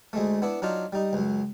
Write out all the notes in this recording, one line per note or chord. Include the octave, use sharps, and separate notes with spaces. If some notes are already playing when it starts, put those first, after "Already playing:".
D2 G#3 A3
B3 D4 E4
F#3 D4 D#4 F4
G3 D#4
C#2 F#2